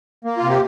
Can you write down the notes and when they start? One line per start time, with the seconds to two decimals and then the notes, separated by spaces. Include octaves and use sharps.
0.25 A#3
0.37 F4
0.43 C3
0.50 G4